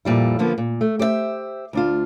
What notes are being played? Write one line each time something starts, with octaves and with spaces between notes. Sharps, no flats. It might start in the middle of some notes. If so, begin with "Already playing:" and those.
F2 A#2 G3 E4
D3 F3 A#3 B3
A#2
A3
G4 C5 C#5 E5
D2 D4 F4